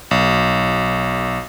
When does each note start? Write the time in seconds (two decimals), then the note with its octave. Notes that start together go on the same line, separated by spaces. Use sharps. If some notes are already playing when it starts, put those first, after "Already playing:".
0.11 B1